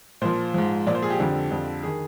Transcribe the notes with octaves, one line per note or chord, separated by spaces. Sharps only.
A#2 F3 C5
G#2 F3
A#2 F3 D5
C5
G#4
G4
F2 D3 F3
F2 D3 F3
D#3 G#4